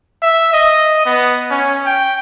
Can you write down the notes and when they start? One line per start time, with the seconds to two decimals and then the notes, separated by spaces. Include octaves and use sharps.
0.23 E5
0.54 D#5
1.06 B3
1.51 C#4
1.86 G5